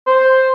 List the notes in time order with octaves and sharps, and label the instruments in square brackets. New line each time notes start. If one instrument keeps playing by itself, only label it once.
[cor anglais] C5